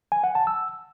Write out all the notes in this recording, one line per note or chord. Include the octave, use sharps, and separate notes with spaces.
G#5
F#5
A5
E6